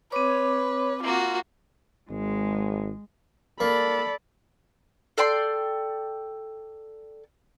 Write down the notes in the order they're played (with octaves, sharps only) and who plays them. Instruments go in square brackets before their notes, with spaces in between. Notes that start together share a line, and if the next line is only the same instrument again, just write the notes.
[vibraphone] C4 D6 [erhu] B4 [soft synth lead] C#5
[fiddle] A#3 F#4 [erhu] F4
[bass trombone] G#1 [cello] G#3
[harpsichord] A#3 [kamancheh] A4 D5 [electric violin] B5
[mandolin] A4 D5 G5 C6